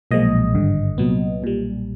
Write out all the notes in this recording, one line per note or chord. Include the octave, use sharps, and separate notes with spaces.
B1 A#2 F3 G#3 D#5
G#1 G2 D3
C2 A#2 F#3 B3
B1 A#2 G3